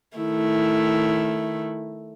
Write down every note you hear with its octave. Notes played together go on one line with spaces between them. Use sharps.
D#3 A3 E4